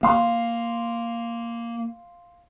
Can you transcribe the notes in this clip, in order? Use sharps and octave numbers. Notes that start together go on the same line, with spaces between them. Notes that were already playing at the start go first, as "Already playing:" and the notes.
A#3 F5 C6